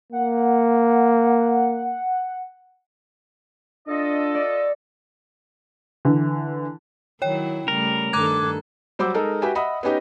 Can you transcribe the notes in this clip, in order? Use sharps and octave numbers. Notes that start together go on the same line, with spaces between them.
A#3 F#5
D4 F4 A4 D#5
D5
D3 E3
D#3 F#3 E4 C#5 G5
C#3 G3 A3 A#4
G2 D#3 A4 A#5 D6 F#6 G#6
F#3 G3 C5 F#5 D6 E6
G#3 D#4 A4 A#4
F#4 G4 B4 E5 G5 G#5
D#5 E5 F#5 B5 D#6
B3 C#4 D#4 G4 D#5